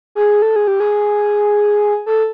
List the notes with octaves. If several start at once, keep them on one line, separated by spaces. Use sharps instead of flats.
G#4
A4
G#4
G4
G#4
A4